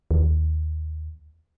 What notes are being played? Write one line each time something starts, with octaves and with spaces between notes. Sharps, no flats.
D#2